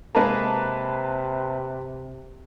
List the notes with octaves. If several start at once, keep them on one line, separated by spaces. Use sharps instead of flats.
C3 G#3 A#3 B4 A5 A#5